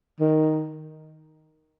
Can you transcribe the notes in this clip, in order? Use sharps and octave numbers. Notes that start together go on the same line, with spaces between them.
D#3